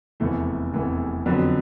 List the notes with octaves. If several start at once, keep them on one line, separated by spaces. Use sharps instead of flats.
F1 E2 C3 E3 A3
F1 E2 C3 E3 A3
F2 D3 F#3 B3